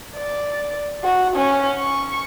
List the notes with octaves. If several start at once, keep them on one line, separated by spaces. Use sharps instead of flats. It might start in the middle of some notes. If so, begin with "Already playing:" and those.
D5
F#4
C#4
C#6